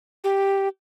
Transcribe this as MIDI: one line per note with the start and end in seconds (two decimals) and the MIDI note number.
0.24 0.68 67